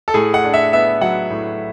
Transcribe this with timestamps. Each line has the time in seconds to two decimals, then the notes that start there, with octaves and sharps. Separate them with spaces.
0.08 A4
0.14 A2 G#4
0.34 F#5
0.44 D4
0.54 E5
0.72 B3 E5
1.01 F#3 F#5
1.30 A2